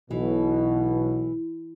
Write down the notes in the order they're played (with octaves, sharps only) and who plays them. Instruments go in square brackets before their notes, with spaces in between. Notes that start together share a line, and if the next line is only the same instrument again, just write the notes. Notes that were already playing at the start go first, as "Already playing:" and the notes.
[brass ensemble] B1 B2 [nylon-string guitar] E3